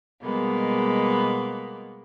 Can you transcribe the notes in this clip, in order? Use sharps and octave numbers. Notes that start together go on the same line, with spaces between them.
B2 G3 G#3 A#3 B3